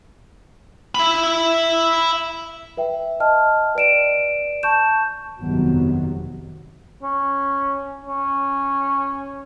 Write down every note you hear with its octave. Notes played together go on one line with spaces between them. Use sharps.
E5 B5
B4 E5 G5
D#5 G5 A5 F6
B4 D5 D7 E7
A5 C#6 G6 E7
G1 F2 C3 D#3 F#3 B3
C#4
C#4